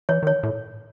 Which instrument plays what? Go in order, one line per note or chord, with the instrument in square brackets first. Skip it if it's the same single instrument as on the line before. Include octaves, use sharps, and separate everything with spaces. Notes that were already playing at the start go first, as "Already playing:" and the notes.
[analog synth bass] E3 [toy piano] C#5
[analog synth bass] D#3 [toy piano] C#5
[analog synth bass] A2